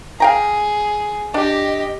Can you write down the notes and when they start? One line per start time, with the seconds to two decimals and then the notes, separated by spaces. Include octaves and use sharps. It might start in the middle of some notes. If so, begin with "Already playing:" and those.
0.20 G#4 F5 G5 A#5
1.34 D4 G4 D#5